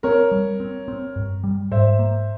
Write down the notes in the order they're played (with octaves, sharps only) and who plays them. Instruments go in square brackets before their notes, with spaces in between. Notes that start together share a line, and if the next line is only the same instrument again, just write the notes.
[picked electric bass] C4 [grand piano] A#4 C#5
[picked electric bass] G3
C4
C4
G2
G3
[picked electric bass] G#2 [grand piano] C5 E5
[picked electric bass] A#3